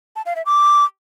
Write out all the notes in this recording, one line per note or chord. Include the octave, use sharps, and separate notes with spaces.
A5
F5
E5
D6